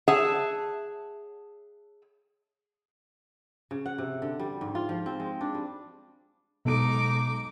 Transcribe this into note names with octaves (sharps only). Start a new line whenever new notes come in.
G#4 C#5 E5 F#5 A5
C#3
F#5
C3
D3
G3
G#2
F4
F3
C4
G#3
D4
G3
B1 B2 G#3 D#4 A4 D6 D7